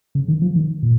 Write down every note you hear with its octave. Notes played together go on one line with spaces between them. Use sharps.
C#3
D#3
F3
D#3
A#2